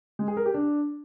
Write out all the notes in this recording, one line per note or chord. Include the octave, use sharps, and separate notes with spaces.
G#3
G#4
A#4
G4
D4